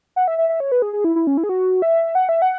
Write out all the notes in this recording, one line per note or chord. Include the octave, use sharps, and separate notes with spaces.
F#5
E5
E5
E5
C#5
B4
G#4
G#4
E4
E4
C#4
E4
G#4
F#4
E5
F#5
E5
F#5